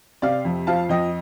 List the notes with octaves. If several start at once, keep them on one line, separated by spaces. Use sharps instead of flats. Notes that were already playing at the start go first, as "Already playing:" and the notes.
C3 D5 F5
F2
F3 F5 A5
F2 D#5 G5